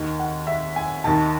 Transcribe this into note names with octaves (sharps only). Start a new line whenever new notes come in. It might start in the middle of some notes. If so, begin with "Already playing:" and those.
Already playing: D#2 D#3
F#5
E5
G#5
D#2 D#3 A5